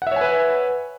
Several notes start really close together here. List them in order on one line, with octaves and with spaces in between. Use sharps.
F#5 E5 C#5 G#5 B4